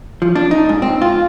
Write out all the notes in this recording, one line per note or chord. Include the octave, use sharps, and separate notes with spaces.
F3
D4
D#4
G#2
C4
F4